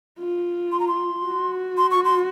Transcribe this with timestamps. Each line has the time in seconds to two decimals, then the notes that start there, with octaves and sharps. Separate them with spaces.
0.19 F4
0.72 C6
0.80 A#5
0.88 C6
1.25 F#4
1.78 C6
1.91 C#6
2.05 C6